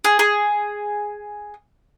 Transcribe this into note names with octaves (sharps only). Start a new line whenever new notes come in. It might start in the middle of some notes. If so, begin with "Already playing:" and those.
G#4
G#4